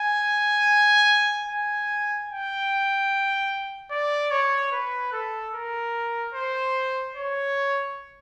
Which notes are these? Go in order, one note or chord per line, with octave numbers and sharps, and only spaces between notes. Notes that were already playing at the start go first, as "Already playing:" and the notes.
Already playing: G#5
G#5
G5
D5
C#5
B4
A4
A#4
C5
C#5